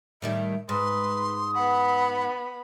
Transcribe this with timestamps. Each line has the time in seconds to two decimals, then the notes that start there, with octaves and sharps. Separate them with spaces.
0.22 A2 D#3 G3 E5
0.69 G#2 B4 C6 D#6
1.55 B3 F#5 B5